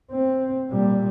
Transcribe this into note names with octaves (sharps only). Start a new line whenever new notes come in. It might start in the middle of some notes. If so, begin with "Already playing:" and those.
C4
A#2 G3